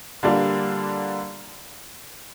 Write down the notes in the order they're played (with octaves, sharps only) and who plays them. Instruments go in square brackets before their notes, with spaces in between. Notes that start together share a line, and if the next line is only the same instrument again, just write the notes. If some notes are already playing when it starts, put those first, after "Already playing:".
[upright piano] D3 G3 A#3 D4 F4